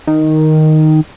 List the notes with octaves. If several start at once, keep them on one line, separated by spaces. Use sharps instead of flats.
D#3